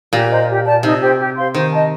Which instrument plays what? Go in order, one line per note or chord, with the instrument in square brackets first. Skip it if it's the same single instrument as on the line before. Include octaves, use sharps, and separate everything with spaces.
[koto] A#2 [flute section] G4
[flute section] C5 D#5 A#5
G4
D5 A5
[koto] C3 [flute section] D#4
[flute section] G4 C5 G5
G4
C5 F5 C6
[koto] D#3 [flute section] C5
[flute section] D#5 A5